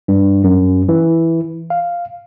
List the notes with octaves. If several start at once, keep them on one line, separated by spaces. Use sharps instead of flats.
G2
F#2
E3
F5